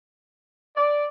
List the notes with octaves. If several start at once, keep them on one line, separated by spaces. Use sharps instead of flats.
D5